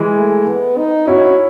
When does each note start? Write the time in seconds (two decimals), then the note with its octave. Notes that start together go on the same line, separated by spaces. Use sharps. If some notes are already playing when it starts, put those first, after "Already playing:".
Already playing: E3 G#3
0.17 A3
0.47 B3
0.77 D#4
1.07 C#4 E4 F#4